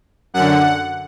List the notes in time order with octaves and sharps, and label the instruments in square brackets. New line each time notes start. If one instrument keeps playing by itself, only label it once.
[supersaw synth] F#2 D3 F#5